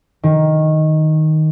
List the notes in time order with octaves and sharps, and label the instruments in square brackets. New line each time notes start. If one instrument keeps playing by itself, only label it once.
[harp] D#3